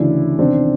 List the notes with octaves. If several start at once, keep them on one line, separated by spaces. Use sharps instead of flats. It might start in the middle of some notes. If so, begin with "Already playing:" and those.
Already playing: D2 C#3 E3 D4 E4
E2 C3 D#3 C4 D4